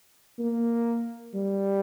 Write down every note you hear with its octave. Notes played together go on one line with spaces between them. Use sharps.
A#3
G3